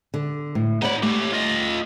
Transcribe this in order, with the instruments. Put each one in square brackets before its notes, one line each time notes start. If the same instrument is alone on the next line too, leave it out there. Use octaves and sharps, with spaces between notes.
[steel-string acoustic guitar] D3
A2
[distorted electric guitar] D#4 B5 [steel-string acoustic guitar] C#5 D5 F#5
[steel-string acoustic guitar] A3 [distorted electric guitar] G4 C#5
[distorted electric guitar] F4 D#5